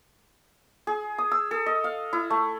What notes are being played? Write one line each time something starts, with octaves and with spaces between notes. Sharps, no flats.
G#4
D#6
E6
A4
D#5
F5
E4
A3